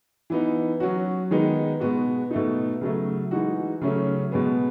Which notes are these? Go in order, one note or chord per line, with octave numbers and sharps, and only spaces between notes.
E3 B3 D#4
F#3 C#4 F#4
D#3 G#3 B3 D#4
B2 G#3 B3 F#4
B2 A3 D#4
C#3 F#3 A3
E3 G#3 D#4 F#4
C#3 F#3 A3 C#4
B2 G#3 B3